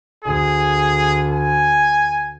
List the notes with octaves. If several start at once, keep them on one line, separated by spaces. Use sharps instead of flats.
D2 G#4
G#5